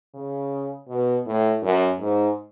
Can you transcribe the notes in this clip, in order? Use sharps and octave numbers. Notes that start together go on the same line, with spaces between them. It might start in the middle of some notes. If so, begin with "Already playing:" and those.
C#3
B2
A2
F#2
G#2